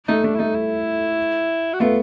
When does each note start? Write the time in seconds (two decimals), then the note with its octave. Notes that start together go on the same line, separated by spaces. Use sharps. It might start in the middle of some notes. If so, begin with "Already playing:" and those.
0.08 A3 D#4
0.24 A3 D4
0.35 E4
0.40 A3 D#4
0.55 E4
1.73 F#4
1.80 A3 B3 F4